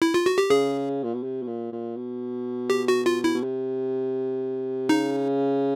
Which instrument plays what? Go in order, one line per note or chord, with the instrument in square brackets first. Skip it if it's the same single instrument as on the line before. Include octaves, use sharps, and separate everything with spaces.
[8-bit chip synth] E4
F4
F#4
G4
[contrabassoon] C#3 [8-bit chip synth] G#4
[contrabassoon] A#2
B2
C3
B2
A#2
A#2
B2
[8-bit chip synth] G4
F#4
F4
E4
[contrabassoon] B2
C3
[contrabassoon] C#3 [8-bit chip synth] D#4